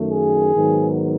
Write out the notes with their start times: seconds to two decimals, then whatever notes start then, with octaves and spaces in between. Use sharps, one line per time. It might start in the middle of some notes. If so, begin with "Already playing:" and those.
Already playing: F#2 D#3 A3
0.11 G#4
0.55 G#2 D#3 F#3 B3